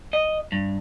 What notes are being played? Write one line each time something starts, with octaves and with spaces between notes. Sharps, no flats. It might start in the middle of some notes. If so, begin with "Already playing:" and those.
D#5
G2